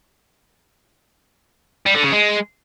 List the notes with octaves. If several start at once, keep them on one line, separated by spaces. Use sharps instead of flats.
G3
D3
C#3
G#3